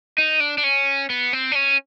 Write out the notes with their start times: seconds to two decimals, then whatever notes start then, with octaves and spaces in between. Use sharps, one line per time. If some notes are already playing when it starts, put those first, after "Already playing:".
0.18 D#4
0.40 D4
0.58 D4
0.64 C#4
1.10 B3
1.33 C4
1.52 D4
1.55 C#4